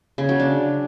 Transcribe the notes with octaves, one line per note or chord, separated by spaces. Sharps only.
C#3
F#3
D4